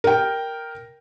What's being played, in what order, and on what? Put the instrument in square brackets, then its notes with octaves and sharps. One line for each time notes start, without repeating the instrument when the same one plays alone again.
[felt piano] A#4 G5